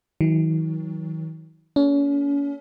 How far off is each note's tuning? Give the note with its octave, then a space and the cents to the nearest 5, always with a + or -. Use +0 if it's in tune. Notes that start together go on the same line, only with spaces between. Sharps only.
D#3 +45 F#3 +0
A#3 +0 C#4 +35 A4 +0